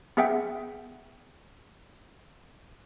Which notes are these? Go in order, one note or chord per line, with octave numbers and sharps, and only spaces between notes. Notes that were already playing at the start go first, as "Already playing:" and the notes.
B3 G#4 E5 F#5 G5